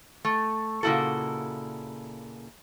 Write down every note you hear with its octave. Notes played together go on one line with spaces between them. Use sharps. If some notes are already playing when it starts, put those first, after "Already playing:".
A3
A#2 C#3 A#3 E4 F#4 A4